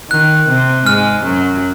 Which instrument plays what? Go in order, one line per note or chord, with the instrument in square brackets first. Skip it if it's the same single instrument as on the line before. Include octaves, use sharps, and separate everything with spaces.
[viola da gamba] D#3 [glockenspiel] F#6
[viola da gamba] C3 C4
[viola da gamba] G#2 G#3 [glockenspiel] F6
[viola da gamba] F#2 F#3